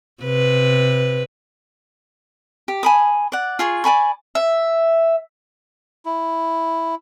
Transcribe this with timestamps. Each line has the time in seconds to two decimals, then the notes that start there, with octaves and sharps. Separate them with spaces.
0.23 C3 B4
2.68 G4
2.83 G#5 B5 D#6
3.32 D5 F#5
3.59 F4 G#4 C#6
3.84 D5 G#5 B5 C#6
4.35 E5
6.05 E4